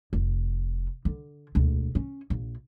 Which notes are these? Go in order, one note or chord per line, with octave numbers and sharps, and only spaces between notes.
F1
D3
E1 D2
C#4
A#1